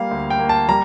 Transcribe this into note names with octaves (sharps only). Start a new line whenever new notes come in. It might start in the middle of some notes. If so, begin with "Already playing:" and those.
Already playing: G3 A#3 F5
D2
G5
A#3
A5
G3 A#5